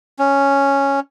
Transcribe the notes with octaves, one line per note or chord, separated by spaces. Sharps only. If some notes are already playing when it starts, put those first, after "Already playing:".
C#4